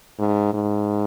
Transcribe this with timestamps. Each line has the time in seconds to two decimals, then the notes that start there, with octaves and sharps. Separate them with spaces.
0.19 G#2
0.54 G#2